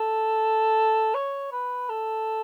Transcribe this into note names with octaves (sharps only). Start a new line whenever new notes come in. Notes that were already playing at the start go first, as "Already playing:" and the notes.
Already playing: A4
C#5
B4
A4